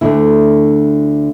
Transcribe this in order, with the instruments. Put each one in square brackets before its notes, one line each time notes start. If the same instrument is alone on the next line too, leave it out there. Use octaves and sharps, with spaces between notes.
[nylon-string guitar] D2 D3 A3 E4